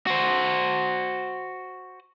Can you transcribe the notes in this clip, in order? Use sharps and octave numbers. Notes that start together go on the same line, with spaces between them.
F#4 C5